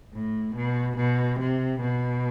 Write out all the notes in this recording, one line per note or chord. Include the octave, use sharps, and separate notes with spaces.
A2
B2
B2
C3
B2